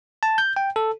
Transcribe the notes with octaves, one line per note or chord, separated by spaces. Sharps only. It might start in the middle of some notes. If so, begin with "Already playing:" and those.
A5
G6
G5
A4